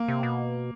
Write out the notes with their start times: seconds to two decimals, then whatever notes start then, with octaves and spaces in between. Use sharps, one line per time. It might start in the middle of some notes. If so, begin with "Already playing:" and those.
Already playing: A#3
0.08 C3
0.23 B2